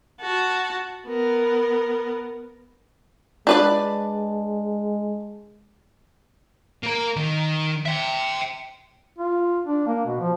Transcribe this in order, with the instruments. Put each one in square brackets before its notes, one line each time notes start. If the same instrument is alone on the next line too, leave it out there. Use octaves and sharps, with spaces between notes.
[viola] F#4 A5
B3 A#4
[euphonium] G#3 [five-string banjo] D4 B4 D5
[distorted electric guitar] A#3 A#4
D#3
E5 G5
[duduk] F4
D4
A#3
B2
F3